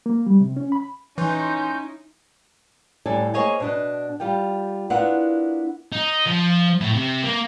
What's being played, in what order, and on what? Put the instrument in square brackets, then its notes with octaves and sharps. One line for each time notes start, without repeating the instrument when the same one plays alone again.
[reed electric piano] A#3
G3
C3
C#4
B5
[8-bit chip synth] E3 [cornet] C#4 [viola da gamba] D#4 E4 [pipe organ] C6 G6
[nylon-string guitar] D#2 A2 G3 A4 D5 G#5
A#3 G#4 C5 C#5 D#5 G#5
B2 D4 D#5
G3 F4 G4 G5
B3 D4 E4 F4 A#4 F#5
[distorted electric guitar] D#4
F3
A2
C3
A#3